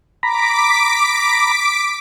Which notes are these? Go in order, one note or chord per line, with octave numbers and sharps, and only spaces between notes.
A#5 B5 D6 B6 D7